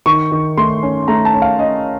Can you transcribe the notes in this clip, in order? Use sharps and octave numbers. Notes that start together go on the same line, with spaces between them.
D#3 C#6
D#3
A3 C6
C#4
A3 A#5
A5
C#4
F5
C#4 D#5